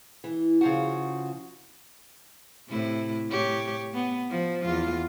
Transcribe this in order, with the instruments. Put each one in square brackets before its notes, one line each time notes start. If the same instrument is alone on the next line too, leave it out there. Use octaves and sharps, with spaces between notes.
[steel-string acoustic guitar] E3
C#3 F3 F#4
[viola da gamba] A2 C3 E4
A2 G4 C#5
B3
F3
E2 F4